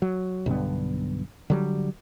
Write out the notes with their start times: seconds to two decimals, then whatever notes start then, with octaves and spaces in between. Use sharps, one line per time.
0.02 F#3
0.46 B1 G2 D3 B3
1.50 D3 F#3 G3